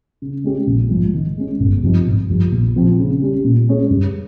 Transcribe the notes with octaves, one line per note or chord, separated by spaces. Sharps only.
C#3
G#3 C#4 G4
A#1
G#2 F3
D#3
G#3 C#4
G1
G2 F3 C4 D#4
G#1
G2 F3
A#1
A#2 F3 C4
C#3
G3 C#4
A#2
G#3 C#4 G#4 C#5
G2